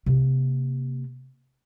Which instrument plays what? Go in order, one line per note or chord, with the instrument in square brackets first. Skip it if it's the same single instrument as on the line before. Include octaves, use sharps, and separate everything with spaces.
[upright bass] C3 A#3